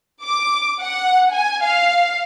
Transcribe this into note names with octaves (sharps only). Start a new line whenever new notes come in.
D6
F#5
G#5
F5